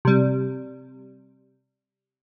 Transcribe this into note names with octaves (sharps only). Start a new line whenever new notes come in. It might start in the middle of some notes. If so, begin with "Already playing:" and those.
C3 G3